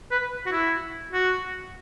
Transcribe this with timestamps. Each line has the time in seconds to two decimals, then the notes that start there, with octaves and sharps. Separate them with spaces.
0.11 B4
0.46 F#4
0.52 E4
1.12 F#4